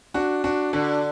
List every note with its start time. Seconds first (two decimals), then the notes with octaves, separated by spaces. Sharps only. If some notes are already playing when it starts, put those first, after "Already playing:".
0.14 D4 F#4
0.44 D4 F#4
0.73 D3 D4 F#4